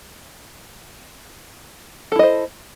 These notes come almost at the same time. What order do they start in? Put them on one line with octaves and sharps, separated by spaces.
A4 E4 D#5 C5